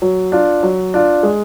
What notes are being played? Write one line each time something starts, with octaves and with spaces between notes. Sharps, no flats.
F#3
D4 F4
F#3
D4 F4
G#3